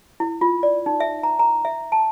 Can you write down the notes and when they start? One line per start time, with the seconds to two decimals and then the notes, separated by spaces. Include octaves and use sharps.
0.20 E4
0.41 F4
0.63 D5
0.86 D#4
1.00 E5
1.23 A#5
1.39 A#5
1.65 E5
1.92 A5